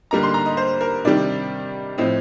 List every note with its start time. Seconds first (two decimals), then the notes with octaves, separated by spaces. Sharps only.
0.11 D3 G3 A#3 D#4 A#5
0.23 C6
0.34 A#5
0.46 D#5
0.57 C5
0.81 A#4
1.05 C3 D#3 G3 D4 D5
1.98 A2 F3 C4 D#5